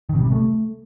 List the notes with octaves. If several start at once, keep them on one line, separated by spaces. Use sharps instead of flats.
D#3
C3
G3
C3
A3